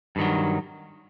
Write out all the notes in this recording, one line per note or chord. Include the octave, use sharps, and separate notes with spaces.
G2 D#3 F#3